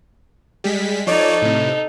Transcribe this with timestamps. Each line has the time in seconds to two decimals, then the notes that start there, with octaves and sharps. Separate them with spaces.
0.64 G3 G#3 B6
1.07 F3 D#4 A4 C#5 D5
1.42 A2 C3